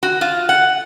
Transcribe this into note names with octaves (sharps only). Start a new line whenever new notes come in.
F#4
F4
F#5